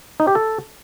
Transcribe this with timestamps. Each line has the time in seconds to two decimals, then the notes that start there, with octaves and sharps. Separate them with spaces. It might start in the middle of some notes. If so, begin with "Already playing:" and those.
0.20 D#4
0.27 G4
0.35 A4